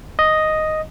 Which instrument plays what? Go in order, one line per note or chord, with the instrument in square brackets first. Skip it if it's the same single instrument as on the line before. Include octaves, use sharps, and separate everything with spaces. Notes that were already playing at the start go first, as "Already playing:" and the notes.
[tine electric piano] D#5